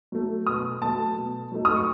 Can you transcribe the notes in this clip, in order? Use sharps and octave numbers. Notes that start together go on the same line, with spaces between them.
F#3 A3
B2 D#6
F#3 A3 A5
B2
F#3 A3 D#4
D#6
C#6